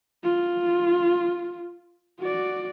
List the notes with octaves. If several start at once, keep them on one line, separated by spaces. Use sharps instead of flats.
F4
F#4 D5